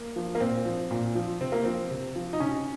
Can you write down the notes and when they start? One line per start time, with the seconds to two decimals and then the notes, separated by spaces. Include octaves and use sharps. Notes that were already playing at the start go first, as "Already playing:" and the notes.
Already playing: A#3
0.16 F3
0.35 A#3
0.40 A#2 C4
0.65 F3
0.91 A#2
1.15 F3
1.41 C3 C4
1.52 A#3
1.64 F3 C4
1.91 C3
2.16 F3
2.33 D#4
2.40 C3 C#4